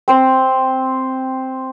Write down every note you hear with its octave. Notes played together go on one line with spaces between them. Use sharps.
C4 C5